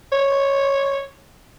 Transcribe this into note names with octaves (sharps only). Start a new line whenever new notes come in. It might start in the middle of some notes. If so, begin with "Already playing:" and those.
C#5